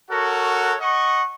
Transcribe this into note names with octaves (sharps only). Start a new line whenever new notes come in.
F#4 A4 A#4 C#5 F#5
D#5 F#5 C#6